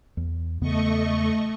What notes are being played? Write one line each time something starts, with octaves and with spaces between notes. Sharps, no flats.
E2
E2 C#3 A3 B3 D#5 C#6